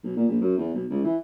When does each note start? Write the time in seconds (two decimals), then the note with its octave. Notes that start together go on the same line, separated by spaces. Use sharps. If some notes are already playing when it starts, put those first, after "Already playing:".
0.04 B1
0.16 A#2
0.28 A#1
0.41 F#2
0.58 E2
0.74 B1
0.90 C#2
1.04 E3